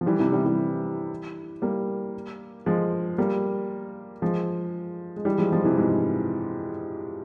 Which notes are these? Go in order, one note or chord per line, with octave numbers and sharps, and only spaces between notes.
F3
E3 G3
C3 E3
E3 G3
E3 G3
G3 A#3
F3 G#3
G3 A#3
F3 G#3
G#3
E3 G3
F3 G#3
F3 G#3
C3 E3
G#2 C3